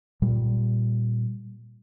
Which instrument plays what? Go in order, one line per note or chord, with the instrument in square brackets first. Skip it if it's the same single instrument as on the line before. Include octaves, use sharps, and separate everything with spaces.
[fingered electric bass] A#2 G3